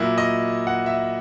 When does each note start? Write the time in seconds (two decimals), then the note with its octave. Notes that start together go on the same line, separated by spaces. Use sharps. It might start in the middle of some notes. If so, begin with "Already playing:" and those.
Already playing: A#2 F#3 A#3 E4
0.18 D#5
0.67 F#5
0.86 E5